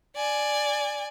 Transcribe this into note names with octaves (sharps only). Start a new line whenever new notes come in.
D5 G#5